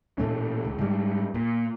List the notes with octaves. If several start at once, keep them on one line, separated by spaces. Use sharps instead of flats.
A1 A#2 A3 C#4
C#2
G#2 G3
A#2